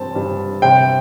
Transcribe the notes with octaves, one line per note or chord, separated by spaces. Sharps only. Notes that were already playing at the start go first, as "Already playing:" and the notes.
Already playing: G2 C4 A5
G2
C3 G5